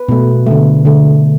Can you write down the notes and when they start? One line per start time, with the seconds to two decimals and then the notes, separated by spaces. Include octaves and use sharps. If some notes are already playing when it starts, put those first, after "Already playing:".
Already playing: B4
0.09 B2 A3
0.46 D3 A3
0.85 D3 A3